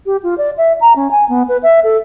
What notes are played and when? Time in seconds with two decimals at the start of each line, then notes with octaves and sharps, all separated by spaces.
0.06 G4
0.23 F4
0.38 D5
0.58 E5
0.81 A#5
0.96 C#4
1.11 G#5
1.29 B3
1.49 B4
1.63 E5
1.84 A4